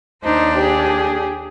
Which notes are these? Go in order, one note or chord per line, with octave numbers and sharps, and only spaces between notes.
D#2 D4 D#4 C5
G4 G#4